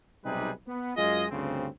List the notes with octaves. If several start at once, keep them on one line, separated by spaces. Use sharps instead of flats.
B1 C3 G3 D#4 G#4 B4
B3
F#2 G#3 F4 G#4 D#5
D2 G2 C#3 C4